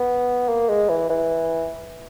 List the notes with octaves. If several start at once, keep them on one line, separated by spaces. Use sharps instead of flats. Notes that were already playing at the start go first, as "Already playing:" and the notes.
Already playing: B3
A#3
G#3
E3
E3